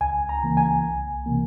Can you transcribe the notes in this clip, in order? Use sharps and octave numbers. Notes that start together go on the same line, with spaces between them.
C#2 G#5
A#5
C#3 E3 A#3
G#5
C2
C3 E3 A#3